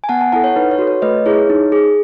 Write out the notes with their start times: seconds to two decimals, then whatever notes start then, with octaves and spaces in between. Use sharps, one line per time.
0.04 G#5
0.09 B3 F#5 A5
0.21 F#5 A5
0.32 E4 A4 F#5 A5
0.44 C#5
0.56 D#4 B4
0.71 C#5
0.79 F#4 A4
0.87 C#5
1.02 A3 B4 D#5
1.26 E4 G#4 C#5
1.49 D#4
1.72 G#4